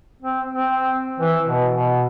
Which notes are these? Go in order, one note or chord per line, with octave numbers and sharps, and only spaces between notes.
C4
C4
E3
B2
B2